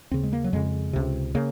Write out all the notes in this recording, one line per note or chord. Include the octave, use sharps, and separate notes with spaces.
D#2 C#3 C4
G#3
A#3
F#3
F2 C#3 G#3
C#2 C3
C#3 A#3